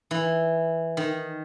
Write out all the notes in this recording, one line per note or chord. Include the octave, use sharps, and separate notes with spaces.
E3
D#3